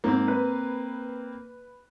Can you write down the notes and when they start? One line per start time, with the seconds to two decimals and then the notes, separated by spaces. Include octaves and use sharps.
0.04 G#2 A#3 C4
0.28 B4